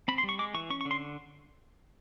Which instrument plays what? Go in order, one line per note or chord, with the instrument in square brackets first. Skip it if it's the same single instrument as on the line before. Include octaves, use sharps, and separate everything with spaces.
[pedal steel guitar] C4 B5
C6
G3
C#6
G#3 D6
E3 C#6
C#4 C#6
C#6
D3
C6